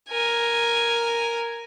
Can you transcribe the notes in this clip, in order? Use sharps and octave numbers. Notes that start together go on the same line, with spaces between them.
A#4 G#5